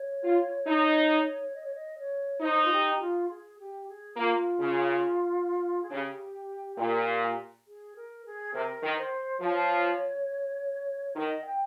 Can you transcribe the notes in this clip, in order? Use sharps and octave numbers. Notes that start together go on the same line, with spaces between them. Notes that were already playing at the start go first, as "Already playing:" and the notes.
Already playing: C#5
F4
D#4
D#5
C#5
D#5
C#5
D#4 C5
F4
G4
F4
G#4
G4
G#4
A#3 F4
C#3
G#4
C#3 G4
A#2
G#4
A#4
G#4
C3 A#4
D#3
C5
F3 C#5
D#3 D#5
G5